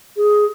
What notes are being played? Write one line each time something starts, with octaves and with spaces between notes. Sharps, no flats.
G#4